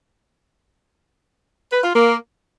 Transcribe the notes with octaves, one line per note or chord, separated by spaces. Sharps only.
B4
F4
A#3